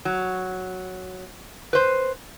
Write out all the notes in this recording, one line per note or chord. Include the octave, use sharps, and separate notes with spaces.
F#3
B4 C5